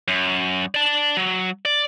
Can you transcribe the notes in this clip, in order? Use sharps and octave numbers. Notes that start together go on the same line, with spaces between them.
F#2
D5 A5
F#3
D5